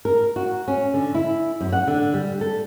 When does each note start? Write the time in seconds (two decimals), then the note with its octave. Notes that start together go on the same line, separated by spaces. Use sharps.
0.05 A#4
0.36 F#4
0.68 C#4
0.94 D3
1.14 E4
1.61 F#2
1.73 F#5
1.87 D3
2.14 G3
2.41 A4